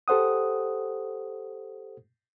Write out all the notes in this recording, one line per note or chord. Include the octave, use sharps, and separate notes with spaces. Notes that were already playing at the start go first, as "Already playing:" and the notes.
G4 A4 C5 F#5 D#6